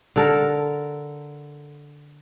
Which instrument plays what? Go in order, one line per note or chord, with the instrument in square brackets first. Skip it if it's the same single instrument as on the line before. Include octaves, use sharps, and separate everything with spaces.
[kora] D3 A4 A#4